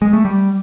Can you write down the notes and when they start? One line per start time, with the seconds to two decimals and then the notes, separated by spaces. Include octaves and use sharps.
0.02 G#3
0.13 A3
0.25 G3